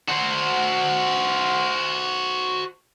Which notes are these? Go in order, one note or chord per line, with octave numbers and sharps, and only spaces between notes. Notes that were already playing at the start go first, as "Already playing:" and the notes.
F#4 C5